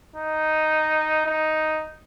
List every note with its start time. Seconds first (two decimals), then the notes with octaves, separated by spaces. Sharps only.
0.16 D#4
1.26 D#4